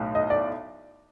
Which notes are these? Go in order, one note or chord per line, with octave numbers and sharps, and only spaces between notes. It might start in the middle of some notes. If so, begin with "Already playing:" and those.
Already playing: B1 A2
D#5
D5